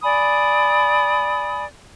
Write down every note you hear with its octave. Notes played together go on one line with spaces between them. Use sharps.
D5 G#5 B5 D#6